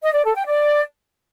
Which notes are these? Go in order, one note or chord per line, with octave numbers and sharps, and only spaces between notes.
D#5
D5
A4
G5
D5